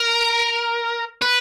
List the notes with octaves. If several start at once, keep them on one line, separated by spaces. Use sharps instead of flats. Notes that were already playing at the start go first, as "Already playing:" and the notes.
Already playing: A#4
B4